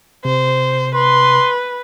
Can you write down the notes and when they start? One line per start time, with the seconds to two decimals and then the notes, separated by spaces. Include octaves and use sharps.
0.25 C3 C5
0.95 B4 C6